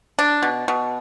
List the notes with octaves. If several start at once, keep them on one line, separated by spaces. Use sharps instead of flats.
D4
B2
B2